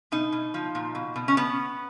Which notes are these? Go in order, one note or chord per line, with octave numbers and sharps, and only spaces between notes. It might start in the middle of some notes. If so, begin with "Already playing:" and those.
B2 D#4
B2
F3
A#2
B2
B2
C#4
B3